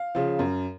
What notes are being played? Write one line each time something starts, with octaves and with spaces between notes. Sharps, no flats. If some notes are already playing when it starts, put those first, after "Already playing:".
Already playing: F5
C#3 F3
F#2